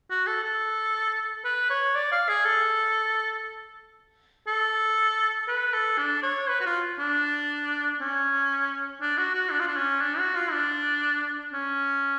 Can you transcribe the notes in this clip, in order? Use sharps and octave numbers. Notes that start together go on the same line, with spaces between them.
F#4
A4
A4
B4
C#5
D5
F5
G#4
A4
A4
B4
A4
D4
C#5
B4
F#4
F4
D4
C#4
D4
F#4
F#4
D4
F4
D4
C#4
D4
F#4
F4
D4
C#4